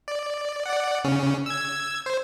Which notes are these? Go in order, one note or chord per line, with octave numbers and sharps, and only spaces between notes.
D5
D5 F#5
C#3 C#4
E6 G#6
C5